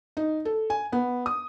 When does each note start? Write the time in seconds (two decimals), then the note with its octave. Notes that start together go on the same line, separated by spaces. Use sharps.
0.17 D#4
0.45 A4
0.70 G#5
0.92 B3
1.26 D#6